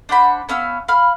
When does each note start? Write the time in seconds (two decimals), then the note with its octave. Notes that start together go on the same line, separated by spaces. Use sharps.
0.09 D4 C5 F#5 B5
0.49 B3 C#4 F5 E6
0.88 F5 B5 F6